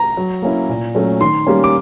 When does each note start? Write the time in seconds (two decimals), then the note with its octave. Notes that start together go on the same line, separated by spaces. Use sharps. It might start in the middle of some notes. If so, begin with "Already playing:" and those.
Already playing: A#5
0.17 F#3
0.42 A#3 C#4 E4
0.69 A#2
0.95 F#3 A3 C#4
1.21 D#3 C6
1.47 G3 A#3 C#4
1.64 D6